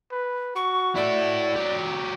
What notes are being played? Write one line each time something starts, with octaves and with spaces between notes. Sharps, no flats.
B4
F#4 C#6
E4 A4 D5
F#3 G4